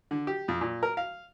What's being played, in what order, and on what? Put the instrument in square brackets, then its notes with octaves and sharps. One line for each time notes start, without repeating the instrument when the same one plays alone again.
[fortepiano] D3
G4
F2
A#2
A#4
F5